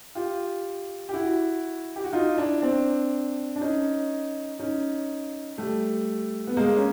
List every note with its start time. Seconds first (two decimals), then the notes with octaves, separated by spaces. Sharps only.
0.15 F4 G4
1.09 G4
1.13 E4 F#4
1.96 G4
2.04 F#4
2.13 D#4 F4
2.37 D4 E4
2.62 C4 D4
3.56 D4
3.61 C#4 D#4
4.59 C#4 D#4
5.58 G3 A3
6.47 B3
6.57 G#3 A#3
6.77 C#4